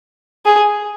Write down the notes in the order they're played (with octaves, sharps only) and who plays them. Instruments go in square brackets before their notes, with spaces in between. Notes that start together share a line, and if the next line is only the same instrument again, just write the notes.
[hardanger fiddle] G#4